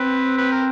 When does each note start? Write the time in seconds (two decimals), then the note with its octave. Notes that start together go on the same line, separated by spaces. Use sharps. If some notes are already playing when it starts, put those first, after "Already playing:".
Already playing: C4 B4
0.38 B4
0.52 A#4